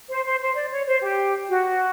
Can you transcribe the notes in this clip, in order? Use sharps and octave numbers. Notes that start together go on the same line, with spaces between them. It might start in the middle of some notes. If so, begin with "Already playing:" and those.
C5
C5
C5
D5
C#5
C5
G4
F#4